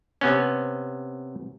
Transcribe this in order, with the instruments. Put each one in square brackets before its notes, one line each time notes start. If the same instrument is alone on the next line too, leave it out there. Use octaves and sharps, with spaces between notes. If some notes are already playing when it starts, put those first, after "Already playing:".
[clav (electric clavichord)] C3 B3 C#4